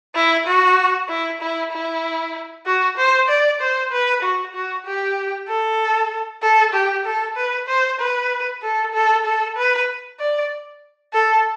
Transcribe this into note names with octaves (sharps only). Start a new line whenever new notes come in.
E4
F#4
E4
E4
E4
F#4
C5
D5
C5
B4
F#4
F#4
G4
A4
A4
G4
A4
B4
C5
B4
A4
A4
A4
B4
D5
A4